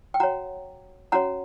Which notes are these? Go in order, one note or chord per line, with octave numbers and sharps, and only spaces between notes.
G5
F#4 C#5 F#5 A#5
C#4 F#4 C#5 F#5 A#5